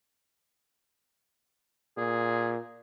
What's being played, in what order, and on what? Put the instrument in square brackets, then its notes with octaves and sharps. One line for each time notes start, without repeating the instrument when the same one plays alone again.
[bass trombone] A#2 [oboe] G#4